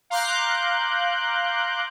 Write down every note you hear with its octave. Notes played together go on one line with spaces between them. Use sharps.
F5 A#5 C6 D6 F#6 G6